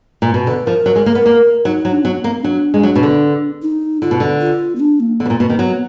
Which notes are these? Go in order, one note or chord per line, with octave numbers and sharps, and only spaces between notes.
A#2
B2
D3 B4
F3 A#4
F#3
G#3
A#3
B3
A#3
F#3 D#4
F#3
D4
F#3 B3
A#3 B3
F#3 D4
G#3
F#3
B2
D3
D#4
D3 F4
B2
D3
F4
B3
D4
A#3
D3 B3
B2
A#2
B2 A#3
D#3
F#3 B3